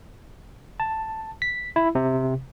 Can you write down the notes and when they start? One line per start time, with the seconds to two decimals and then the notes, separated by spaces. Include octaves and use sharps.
0.80 A5
1.42 B6
1.76 E4
1.95 C3